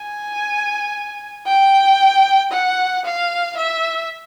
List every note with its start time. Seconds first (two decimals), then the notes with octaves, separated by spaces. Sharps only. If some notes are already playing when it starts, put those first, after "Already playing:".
Already playing: G#5
1.47 G5
2.52 F#5
3.05 F5
3.57 E5